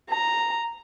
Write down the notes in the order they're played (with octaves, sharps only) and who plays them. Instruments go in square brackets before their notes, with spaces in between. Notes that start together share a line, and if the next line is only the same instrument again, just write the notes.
[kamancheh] A#5